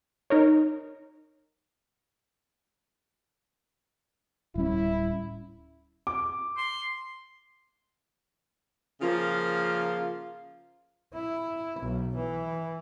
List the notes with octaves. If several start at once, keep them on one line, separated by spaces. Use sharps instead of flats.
D#4 A#4 C#5
D1 G3 C#4 E4
D6
C6
C#3 F3 A#3 F4
E4
B1
E3